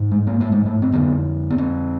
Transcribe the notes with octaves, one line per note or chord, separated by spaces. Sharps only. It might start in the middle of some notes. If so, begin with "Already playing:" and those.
Already playing: G#2
G#3
A#3
A3
G#3
A3
C4
F2 D3 B3
B3
C4